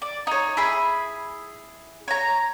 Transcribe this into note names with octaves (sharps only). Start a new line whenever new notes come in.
D5
D#4 C#5
E4 G#4 B5
C#5 A#5